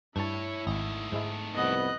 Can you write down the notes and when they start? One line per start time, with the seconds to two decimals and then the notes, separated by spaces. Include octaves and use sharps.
0.16 G2 A3 E4 C#5 A5
0.67 G#1 A3 D#4
1.12 G#2 G#3 E4
1.55 C2 F2 B3 D#5 F#6